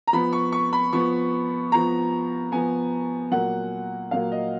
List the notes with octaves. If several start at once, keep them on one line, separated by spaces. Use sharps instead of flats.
A#5
F3 B3 B5
C#6
C#6
B5
F3 B3 C#6
F3 B3 A#5
F3 B3 G#5
A#2 F#3 A#3 F#5
A#2 F#3 A#3 F5
D#5